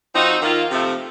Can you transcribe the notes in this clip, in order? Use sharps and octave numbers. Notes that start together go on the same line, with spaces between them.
F3 C4 D#4 F#4
D#3 A#3 F4
C3 F3 A3